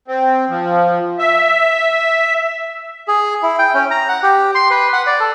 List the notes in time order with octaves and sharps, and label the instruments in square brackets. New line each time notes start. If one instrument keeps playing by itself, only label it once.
[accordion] C4
F3
E5
[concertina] G#4
E4
G5
C#4
A#5
F#5
G4
C6
B4
F#5
D5
A4